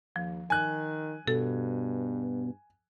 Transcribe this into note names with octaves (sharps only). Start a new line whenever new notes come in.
D#2 F3
D#3 G#5 F#6
G2 B2 A4